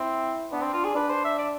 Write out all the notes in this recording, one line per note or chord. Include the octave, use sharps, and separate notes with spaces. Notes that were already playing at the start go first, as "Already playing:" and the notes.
Already playing: C4 E4
B3 D4
C4
F4
G#4
D4 B4
C5
E5
D5